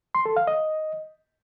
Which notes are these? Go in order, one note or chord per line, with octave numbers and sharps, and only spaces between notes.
C6
A4
F5
D#5